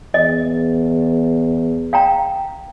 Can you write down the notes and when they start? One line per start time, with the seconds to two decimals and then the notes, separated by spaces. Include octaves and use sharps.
0.14 E2 D#5
1.93 F5 G5 A#5